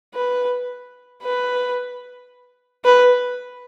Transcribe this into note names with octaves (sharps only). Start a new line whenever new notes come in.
B4
B4
B4